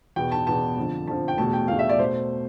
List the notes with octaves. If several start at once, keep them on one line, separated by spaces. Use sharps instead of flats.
E2 B2 B3 G5
A5
E2 B2 B3 A5
F2 D3 F3
F2 D3 F3 A5
G5
E2 B2 A3 A5
G5
E2 B2 A3 F5
E5
D5
B2 A3 C5